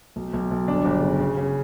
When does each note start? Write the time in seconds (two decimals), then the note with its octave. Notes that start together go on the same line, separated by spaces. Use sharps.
0.16 B1
0.33 B1
0.51 B1
0.68 G1 D4
0.85 G1
1.02 C#3
1.20 C#3
1.37 C#3